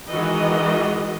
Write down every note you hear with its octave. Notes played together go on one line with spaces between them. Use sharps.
D#3 E3 G#3 F#4 D#5